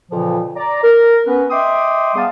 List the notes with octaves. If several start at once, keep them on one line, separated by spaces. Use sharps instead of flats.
F2 A#2 C#3 E3 F3
D5 A#5
A#4
B3 C#4 B4
D#5 E5 G5 C6 D6 D#6
G#2 G3 B3 F5 A5 D#6